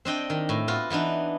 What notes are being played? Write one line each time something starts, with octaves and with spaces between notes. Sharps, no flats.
C4 D4 D#5 G5
D#3
A2
B3 F4 F#4
E3 B3 D4 D#4